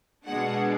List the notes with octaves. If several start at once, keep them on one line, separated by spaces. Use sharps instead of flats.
B2 G#3 D4 F#5